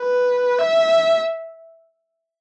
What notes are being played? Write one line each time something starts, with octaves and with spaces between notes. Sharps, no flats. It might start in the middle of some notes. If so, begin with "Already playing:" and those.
Already playing: B4
E5